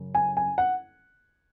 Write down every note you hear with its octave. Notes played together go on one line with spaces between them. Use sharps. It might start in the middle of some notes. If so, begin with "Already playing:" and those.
Already playing: F#2 C#3
G#5
G#5
F#5